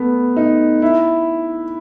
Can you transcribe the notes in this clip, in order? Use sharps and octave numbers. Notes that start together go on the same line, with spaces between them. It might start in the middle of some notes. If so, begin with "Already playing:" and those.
Already playing: A3 B3
D#4
E4